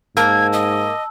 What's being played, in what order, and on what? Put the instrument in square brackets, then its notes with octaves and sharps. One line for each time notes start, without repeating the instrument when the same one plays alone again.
[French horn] G#2 [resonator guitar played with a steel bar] A#3 [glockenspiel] A5 E6 [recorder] G#6
[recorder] D#5